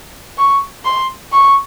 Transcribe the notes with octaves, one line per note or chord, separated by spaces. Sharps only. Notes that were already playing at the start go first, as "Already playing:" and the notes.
C#6
C6
C#6